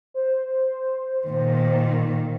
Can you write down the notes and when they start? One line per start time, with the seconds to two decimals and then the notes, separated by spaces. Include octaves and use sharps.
0.14 C5
1.27 A#2 D#3